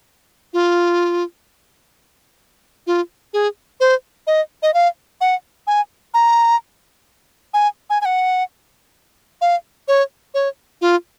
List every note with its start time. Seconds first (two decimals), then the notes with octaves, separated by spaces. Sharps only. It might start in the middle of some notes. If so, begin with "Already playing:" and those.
0.53 F4
2.87 F4
3.33 G#4
3.80 C5
4.27 D#5
4.63 D#5
4.74 F5
5.21 F#5
5.67 G#5
6.14 A#5
7.54 G#5
7.90 G#5
8.01 G#5
8.05 F#5
9.41 F5
9.88 C#5
10.34 C#5
10.81 F4